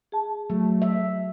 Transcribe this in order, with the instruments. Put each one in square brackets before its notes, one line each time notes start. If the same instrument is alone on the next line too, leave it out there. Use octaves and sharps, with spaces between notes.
[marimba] G#4 A5
[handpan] F#3 [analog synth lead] A3
[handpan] E5